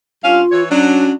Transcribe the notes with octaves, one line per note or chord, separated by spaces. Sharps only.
G2 C#4 F4 F5
E3 C#5
F#3 C#4 D4